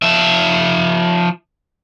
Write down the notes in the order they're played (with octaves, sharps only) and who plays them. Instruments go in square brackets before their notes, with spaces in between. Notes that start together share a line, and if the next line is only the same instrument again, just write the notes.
[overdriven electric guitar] F3 E5